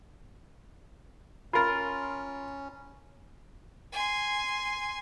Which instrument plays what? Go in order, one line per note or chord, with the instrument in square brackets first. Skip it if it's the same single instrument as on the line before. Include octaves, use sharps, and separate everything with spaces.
[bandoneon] C#4 [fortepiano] F4 A#4 [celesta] B5 A6
[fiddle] G#5 C6